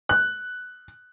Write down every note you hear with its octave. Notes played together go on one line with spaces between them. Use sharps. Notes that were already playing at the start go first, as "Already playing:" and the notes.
F#6